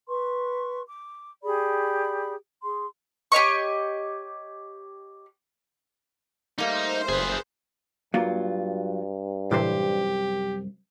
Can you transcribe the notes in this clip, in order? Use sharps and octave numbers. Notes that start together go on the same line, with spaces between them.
B4 C6 C#6
D6
G4 G#4 D5 B5
G#4 C6
G4 C#5 D#5 C#6
G3 A3 A#3 D#4 C5
F#1 G#4 B4
G2 F#3 A#3 F4
C2 F#2 A2 C3 E3 G4 C5